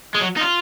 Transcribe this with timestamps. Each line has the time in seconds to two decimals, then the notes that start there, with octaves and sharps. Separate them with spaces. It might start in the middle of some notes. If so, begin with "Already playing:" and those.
0.14 G#3
0.21 F#3
0.36 D#4
0.41 F4